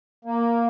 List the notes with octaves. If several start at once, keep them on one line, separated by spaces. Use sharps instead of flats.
A#3